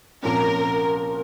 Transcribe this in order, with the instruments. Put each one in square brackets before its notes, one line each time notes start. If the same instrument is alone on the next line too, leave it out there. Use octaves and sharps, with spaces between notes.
[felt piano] C2 A#2 F3 A#3 C#4 [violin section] A#4